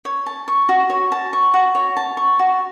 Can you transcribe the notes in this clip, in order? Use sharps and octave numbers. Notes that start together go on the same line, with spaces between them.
C#5
A5
C#6
F#4
C#5
A5
C#6
F#4
C#5
A5
C#6
F#4